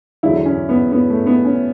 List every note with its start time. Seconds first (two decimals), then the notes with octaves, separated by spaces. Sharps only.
0.23 E2 D3 F#3 E4
0.45 C#4
0.69 B3
0.92 B3
1.10 A3
1.26 B3
1.44 C#4